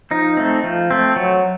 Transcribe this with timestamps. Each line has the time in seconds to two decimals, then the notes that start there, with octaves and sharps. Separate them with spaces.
0.11 F3 D#4
0.37 A3 C4
0.64 F3
0.91 A3 C4
1.16 F#3